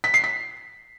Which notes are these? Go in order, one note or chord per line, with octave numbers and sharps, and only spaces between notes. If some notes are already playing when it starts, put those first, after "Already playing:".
B6
C7
B6